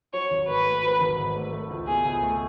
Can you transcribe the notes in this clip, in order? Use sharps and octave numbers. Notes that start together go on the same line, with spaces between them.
F#3 C#5
G#1
G#2 B4
A3
F#3
G#1
G#2
A3
A3
C#2
B2 G#4
C#2
A3